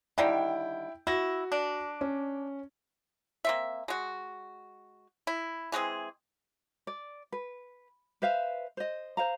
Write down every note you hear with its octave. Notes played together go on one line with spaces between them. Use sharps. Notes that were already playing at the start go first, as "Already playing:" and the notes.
D3 D#3 G3 E4 G5
E4 F#4 A#6
D4
C#4
A#3 C4 E5
G#3 F#4
E4
E3 G#3 C4 G#4
D5
B4
B4 C5 E5 F5
C5 D#5
C5 F5 A#5